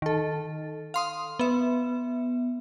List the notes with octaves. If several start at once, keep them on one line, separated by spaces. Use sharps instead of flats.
D#3 A4
F5 C6 D#6
B3 E5